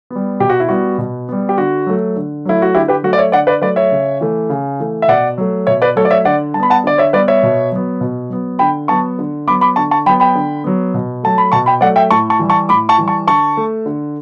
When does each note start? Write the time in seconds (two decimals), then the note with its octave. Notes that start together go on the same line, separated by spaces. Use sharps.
0.10 G3 B3
0.40 B2 G4
0.50 F#4
0.60 E4
0.69 G3 B3 F#4
0.98 B2
1.29 G3 B3
1.49 G4
1.57 D3 F#4
1.87 F#3 A3
2.16 D3
2.45 F#3 A3 E4
2.62 F#4
2.75 D3 E4 G4
2.88 G4 B4
3.03 F#3 A3 F#4
3.13 D5
3.18 C#5 E5
3.32 D3 D5 F#5
3.47 B4 D5
3.62 F#3 A3 B4 D5
3.76 C#5 E5
3.91 C#3
4.21 E3 A3
4.49 C#3
4.80 E3 A3
5.02 E5
5.08 B2 D5 F#5
5.38 F#3 A3
5.67 B2 C#5 E5
5.82 B4 D5
5.96 F#3 A3 A4 C#5
6.05 D5
6.11 C#5 E5
6.25 D3 D5 F#5
6.54 G3 A5
6.60 B3 B5
6.70 F#5 A5
6.84 D3 D5
6.98 C#5 E5
7.13 G3 B3 B4 D5
7.28 C#5 E5
7.43 B2
7.72 F#3 B3
8.01 B2
8.30 F#3 B3
8.59 D3 G5 B5
8.88 F#3 B3 A5 C#6
9.19 D3
9.47 F#3 B3 B5 D6
9.61 B5 D6
9.76 D3 A5 C#6
9.91 A5 C#6
10.06 F#3 G5 B5
10.09 B3
10.20 G5 B5
10.35 D3
10.64 F#3 B3
10.94 B2
11.23 F#3 A3 A5
11.38 B5
11.52 B2 A5 C#6
11.66 G5 B5
11.81 F#3 A3 D5 F#5
11.96 E5 G5
12.11 A2 A5 C#6
12.30 A5 C#6
12.39 E3 G3
12.50 A5 C#6
12.69 A2 B5 D6
12.89 A5 C#6
12.98 E3 G3
13.08 A5 C#6
13.27 D3 A5 C#6
13.57 A3
13.86 D3